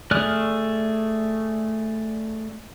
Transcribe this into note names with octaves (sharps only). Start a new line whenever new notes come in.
A3 G#4 D5 F6 F#6